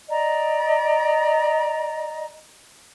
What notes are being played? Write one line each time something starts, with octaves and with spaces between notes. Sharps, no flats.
D5 D#5 A#5